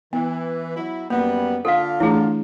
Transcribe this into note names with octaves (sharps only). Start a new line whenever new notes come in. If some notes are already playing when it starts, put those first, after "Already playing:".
E3 B3
F#3 E4
F#2 G3 A#3 B3
D3 F4 A4 F5
E3 A3 D4 E4 G#4